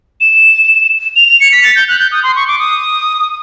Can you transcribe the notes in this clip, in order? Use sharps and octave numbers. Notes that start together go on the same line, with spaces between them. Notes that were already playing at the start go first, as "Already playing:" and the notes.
E7
F7
F7
C#7
B6
A6
G6
F#6
G6
D#6
C6
C#6
D6
D#6